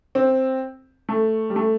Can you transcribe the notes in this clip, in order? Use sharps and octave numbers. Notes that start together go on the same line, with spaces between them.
C4
A3
G3
A3